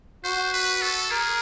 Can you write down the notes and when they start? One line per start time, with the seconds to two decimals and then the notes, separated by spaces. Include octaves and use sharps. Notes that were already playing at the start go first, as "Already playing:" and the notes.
0.24 F#4 C5
0.53 B4
0.82 A4
1.10 G#4 A#4